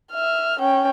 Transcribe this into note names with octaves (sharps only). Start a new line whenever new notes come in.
E5 F6
C#4 G5